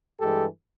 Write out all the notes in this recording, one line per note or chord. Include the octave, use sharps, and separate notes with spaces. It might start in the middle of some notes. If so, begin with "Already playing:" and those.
G2 E3 G#3 G4 A4